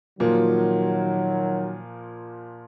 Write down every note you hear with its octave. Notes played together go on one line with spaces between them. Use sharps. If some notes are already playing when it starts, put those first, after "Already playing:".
A#2 D#3 F3 F#3 A#3